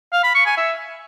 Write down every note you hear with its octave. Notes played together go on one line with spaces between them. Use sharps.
F5
B5
C#6
G#5
E5